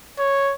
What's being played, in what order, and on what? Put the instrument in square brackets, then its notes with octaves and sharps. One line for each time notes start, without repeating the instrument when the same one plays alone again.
[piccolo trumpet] C#5